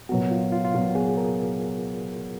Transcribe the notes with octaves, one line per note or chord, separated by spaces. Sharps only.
A#2 F#3 B3 F#4
F4
F4
F4
A#2 F#3 B3 F#4
G#4
A#4